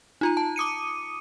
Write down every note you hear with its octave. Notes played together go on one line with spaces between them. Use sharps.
D#4 F4 A#5
A5
D6 D#6 C#7 D#7